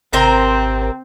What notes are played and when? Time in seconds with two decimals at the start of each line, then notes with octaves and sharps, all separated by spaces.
0.13 G#1 C3 C4 A#4 C5